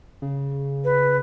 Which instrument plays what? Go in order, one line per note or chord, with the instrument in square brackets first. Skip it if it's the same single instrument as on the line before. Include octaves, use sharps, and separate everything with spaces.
[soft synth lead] C#3
[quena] B4